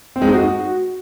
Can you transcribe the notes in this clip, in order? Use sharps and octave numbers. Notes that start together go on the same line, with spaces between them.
C4
G#3
D#4
F#4